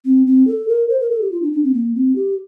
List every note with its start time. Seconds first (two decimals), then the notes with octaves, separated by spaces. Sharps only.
0.05 C4
0.27 C4
0.47 A4
0.68 A#4
0.89 C5
1.00 A#4
1.11 A4
1.21 G4
1.32 F4
1.42 D4
1.53 D4
1.64 C4
1.74 A#3
1.95 C4
2.16 G4